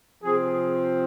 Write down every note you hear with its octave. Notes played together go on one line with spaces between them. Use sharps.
C3 F3 C4 G#4